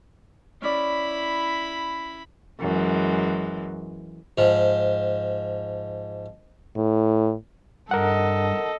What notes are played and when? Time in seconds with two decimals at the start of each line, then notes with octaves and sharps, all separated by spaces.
0.62 C#4 E4 D5 B5
2.60 F#2 E3 G#3
4.38 G#2 F3
6.76 A2
7.91 G2 A4 A#4 D#5 F#5